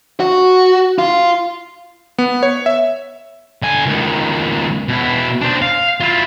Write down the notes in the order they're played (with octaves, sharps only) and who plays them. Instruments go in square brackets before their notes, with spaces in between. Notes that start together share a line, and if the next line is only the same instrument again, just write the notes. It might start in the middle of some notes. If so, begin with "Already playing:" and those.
[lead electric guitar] F#4
F4
[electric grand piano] B3
C#5
E5
[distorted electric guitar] D3 G#5
C#2 D#3
B2 E4
D4 C5
F5
E4 F4